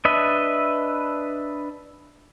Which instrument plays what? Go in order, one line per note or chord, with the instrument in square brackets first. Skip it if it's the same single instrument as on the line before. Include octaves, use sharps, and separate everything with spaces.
[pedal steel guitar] D4 B4 D#5 E5